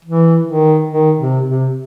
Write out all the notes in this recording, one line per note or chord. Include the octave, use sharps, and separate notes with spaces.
E3
D#3
D#3
C3
C3